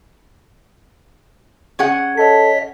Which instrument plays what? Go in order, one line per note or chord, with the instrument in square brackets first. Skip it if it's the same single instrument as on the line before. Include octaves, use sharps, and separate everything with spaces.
[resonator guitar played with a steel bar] C#4 G#4 F#5
[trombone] A4 [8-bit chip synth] C#5 D#5 B6